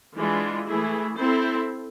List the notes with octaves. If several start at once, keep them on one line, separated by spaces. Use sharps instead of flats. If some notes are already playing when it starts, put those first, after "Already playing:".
E3 G#3 D4 F4
E3 A3 E4 G#4
C4 E4 A4 C5